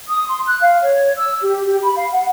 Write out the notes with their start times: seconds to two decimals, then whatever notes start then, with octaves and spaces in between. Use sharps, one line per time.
0.08 D#6
0.28 C6
0.45 F#6
0.61 F5
0.81 C#5
1.17 E6
1.42 G4
1.65 G4
1.83 B5
1.96 F5
2.11 F#5